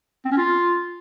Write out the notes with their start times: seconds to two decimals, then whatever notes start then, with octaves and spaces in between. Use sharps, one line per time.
0.25 C4
0.31 C#4
0.38 F4